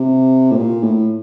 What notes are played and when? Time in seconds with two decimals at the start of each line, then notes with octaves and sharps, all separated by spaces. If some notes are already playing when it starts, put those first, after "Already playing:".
Already playing: C3
0.52 A2
0.58 A#2
0.83 A2